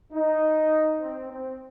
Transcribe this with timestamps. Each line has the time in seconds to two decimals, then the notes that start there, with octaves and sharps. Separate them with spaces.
0.13 D#4
1.01 C4
1.30 C4